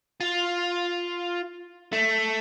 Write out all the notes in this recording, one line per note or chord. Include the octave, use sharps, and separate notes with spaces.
F4
A3